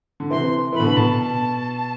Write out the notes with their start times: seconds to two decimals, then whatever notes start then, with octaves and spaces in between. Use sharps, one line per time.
0.20 D3
0.30 C3 E3 C6
0.73 E3 B5
0.80 B2 D3
0.97 B2 A5